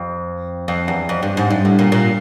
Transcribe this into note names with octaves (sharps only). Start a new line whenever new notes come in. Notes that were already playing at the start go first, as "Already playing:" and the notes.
Already playing: F2
F2
E2
F2
G2
G#2
G2
A2
A#2
A#2